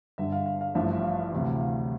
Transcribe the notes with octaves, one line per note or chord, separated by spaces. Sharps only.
G1 G2 D3 E5
F5
F5
F5
A1 G2 F3 E5
E5
F5
D2 C3 E3
F5